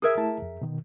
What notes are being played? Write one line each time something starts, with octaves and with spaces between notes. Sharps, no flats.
G#4 A#4 E5 D#6 E6 G#6
A3 E4 A5
F2
B2 D#3